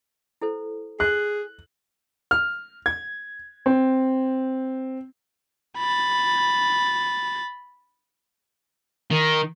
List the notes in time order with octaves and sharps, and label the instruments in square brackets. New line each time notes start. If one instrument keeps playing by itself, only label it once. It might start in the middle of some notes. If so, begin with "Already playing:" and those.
[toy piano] E4 A4 C5
[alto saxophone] G#4 [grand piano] F#6
[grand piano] F6
G#6
C4
[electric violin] B5 A6
[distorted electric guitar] D#3